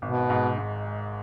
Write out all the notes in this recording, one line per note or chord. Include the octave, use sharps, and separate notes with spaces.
G#1 B2
G#2
G#2
G#3